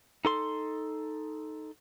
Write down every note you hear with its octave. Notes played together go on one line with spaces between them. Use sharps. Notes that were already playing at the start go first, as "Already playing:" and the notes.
D#4 A4 C6